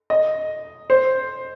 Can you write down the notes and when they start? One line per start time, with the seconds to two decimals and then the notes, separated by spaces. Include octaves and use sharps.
0.10 D#5
0.90 C5